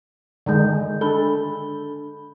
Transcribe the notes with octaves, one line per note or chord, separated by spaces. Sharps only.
D3 D#3 G#3 D5 G6
D4 A4 B5 G7